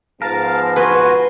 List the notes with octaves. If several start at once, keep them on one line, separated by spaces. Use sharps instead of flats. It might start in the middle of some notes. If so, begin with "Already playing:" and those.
G#2 F3 B3 A#4 F5 A5
F#4 B4 G#5 C6